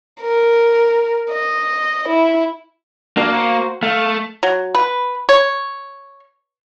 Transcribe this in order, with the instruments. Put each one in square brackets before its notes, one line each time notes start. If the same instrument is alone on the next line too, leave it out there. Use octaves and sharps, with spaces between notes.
[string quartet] A#4
D#5
E4
[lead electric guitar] A#3 [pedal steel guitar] D4 F#4 F5
[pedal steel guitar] F#4 C5
[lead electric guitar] A3 [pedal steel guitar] F5
[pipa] F#3
B4
C#5